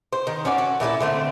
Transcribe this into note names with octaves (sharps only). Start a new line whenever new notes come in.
C5
D#3
C#4 F#4 D5
F#4 A4
A#2 E4 G#4 A4
D3 A3 C4